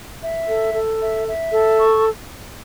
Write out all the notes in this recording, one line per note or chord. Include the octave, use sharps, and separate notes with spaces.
E5
A4
A4
E5
E5
A4
C#6